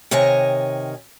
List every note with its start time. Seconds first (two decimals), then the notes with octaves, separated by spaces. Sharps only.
0.11 C3 D#3 C#5 D#5 G#5